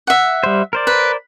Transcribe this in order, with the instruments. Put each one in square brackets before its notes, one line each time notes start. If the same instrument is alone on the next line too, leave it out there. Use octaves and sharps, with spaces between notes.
[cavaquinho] E5 F#5
[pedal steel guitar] G3 C5
A#4 C5 D5
[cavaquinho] B4